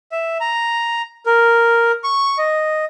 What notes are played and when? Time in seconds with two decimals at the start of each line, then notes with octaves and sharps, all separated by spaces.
0.12 E5
0.40 A#5
1.26 A#4
2.04 C#6
2.38 D#5